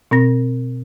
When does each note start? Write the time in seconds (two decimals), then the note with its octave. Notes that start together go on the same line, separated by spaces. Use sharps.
0.11 B2 C4 A#6